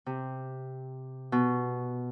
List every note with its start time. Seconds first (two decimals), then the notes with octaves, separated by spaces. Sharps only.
0.06 C3
1.32 B2